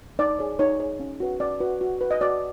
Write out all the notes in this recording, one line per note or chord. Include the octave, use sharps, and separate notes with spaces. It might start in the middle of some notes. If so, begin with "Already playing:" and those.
D#4 D5
G#4 C#5
D#4 C#5
G#4 C#5
C#4
F#4 B4
C#4 D5
F#4 B4
F#4
B4
D#5
F#4 D5